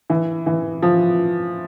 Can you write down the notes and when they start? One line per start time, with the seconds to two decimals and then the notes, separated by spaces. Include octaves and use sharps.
0.10 E3
0.46 E3
0.82 F3